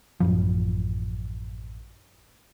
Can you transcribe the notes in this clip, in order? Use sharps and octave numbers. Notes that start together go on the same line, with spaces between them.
A1 F#2 F3